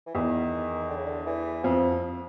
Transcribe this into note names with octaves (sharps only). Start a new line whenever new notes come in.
E3
E2 D#3
D3
C#3
D3
E3
F2 F3